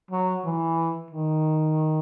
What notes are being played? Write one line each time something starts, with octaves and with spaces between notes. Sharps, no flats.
F#3
E3
D#3